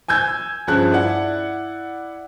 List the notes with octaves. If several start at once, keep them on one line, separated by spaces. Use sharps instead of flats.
G#5 E6 G6 G#6
G2 F3 C#4 G#4 F#6 G#6
E4 D5 F#5